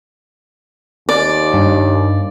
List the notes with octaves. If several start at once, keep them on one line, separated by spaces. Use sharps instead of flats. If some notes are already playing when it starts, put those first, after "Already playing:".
D#2 D5
G2